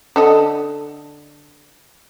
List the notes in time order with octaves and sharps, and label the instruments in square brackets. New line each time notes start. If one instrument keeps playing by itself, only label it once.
[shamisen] D3 A4 D#5